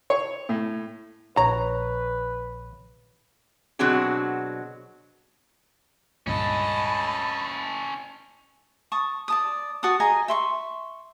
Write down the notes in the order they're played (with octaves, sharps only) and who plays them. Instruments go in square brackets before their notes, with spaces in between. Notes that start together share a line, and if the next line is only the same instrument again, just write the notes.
[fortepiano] C#5
A2
[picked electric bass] A#1 [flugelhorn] B4 [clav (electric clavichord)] C#5 [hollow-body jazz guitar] A#5
[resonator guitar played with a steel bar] B2 F#3 C4 D4 F#4 G#4
[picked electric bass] C#2 G2 A#2 [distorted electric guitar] C#4 A4 [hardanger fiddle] D#5 A5 [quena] B5
[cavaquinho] A5 C#6 D#6
D5 A5 D#6
F#4 F#5 A5 D#6
G#4 D#5 G#5 A#5
E5 C6 C#6